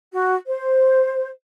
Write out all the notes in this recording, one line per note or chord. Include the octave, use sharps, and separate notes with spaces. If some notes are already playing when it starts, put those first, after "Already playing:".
F#4
C5